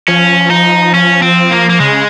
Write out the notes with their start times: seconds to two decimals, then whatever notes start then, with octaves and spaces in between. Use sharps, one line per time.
0.08 F3 C#4
0.50 D#4
0.94 C#4
1.22 C4
1.51 A#3
1.70 A#3
1.80 C#3 G#3